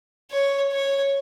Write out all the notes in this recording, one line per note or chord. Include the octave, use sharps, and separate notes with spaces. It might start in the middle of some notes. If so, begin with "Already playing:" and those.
C#5
C#5